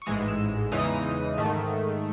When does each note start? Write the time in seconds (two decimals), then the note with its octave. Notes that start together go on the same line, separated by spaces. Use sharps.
0.02 C#6
0.06 A1 G#2 E3 G#3 D#6
0.28 E6
0.50 E6
0.72 E2 C#3 E3 G#3 D#4 D#6
1.37 G#2 D#3 A3